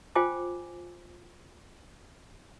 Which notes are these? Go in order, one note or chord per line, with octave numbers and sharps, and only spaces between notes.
F4 C5 G5 G#5 D6